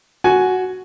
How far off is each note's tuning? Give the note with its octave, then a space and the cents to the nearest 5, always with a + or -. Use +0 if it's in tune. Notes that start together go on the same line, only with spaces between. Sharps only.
F#4 +0 G#5 +15